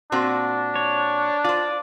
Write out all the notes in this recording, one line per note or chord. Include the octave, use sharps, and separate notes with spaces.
A#2 C4 D4 F#4
C#5
F4 C5 D5